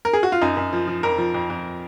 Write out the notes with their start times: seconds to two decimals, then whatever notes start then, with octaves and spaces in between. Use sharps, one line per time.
0.05 A#4
0.13 G#4
0.23 F#4
0.32 F4
0.42 F#2 D#4
0.57 F#2
0.73 F3
0.87 F3
1.03 F2 A#4
1.18 F3
1.34 F2
1.50 F2